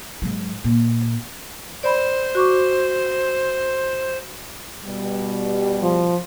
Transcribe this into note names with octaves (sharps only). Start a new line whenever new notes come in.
G#2 F#3
A#2
C5 D5 B5
F#4 C#6 D6
B2 G3
F3